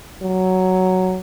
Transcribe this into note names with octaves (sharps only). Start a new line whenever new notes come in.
F#3